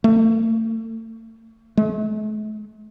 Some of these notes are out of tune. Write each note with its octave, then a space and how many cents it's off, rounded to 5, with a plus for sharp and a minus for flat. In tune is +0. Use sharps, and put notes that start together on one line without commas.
A3 +40
A3 -45